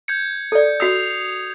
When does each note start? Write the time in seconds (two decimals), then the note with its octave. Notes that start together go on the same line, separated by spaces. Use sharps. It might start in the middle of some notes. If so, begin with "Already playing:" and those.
0.08 G6 G#6 C#7
0.52 A4 D5
0.80 F#4 D#6 E6 C7 F7